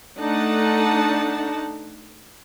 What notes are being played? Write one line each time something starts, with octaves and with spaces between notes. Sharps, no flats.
A3 D4 D#4 F#5 A5